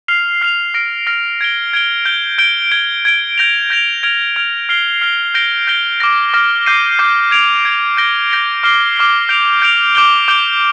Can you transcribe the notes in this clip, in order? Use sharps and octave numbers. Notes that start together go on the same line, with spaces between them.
F6 C7 F7
F6 C7 F7
F6 A#6 D7
F6 A#6 D7
G#6 D7 G7
G#6 D7 G7
G6 D7 G7
G6 D7 G7
G#6 D7 G7
G#6 D7 G7
G6 A#6 F7
G6 A#6 F7
F6 G#6 D7 F7
F6 G#6 D7 F7
F6 C7 G7
F6 C7 G7
G6 A#6 D7 G7
G6 A#6 D7 G7
D6 F6 A#6
D6 F6 A#6
D6 G6 C7 D#7
D6 G6 C7 D#7
G#6 D7 F7
G#6 D7 F7
G6 A#6 D7 G7
G6 A#6 D7 G7
D6 F6 C7 G7
D6 F6 C7 G7
G6 D7 F7
G6 D7 F7
D6 G6 D7 G7
D6 G6 D7 G7